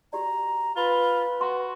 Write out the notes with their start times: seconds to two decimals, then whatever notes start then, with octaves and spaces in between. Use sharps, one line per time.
0.13 F#4 G4 D5 A#5
0.76 F4 B4 B5
1.41 F#4 C6